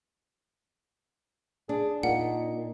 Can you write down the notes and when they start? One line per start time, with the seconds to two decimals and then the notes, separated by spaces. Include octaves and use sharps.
1.69 D4 G#4
2.03 A#2 D#4 F#5